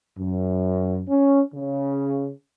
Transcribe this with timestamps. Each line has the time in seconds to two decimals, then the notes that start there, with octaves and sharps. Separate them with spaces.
0.19 F#2
1.09 C#4
1.53 C#3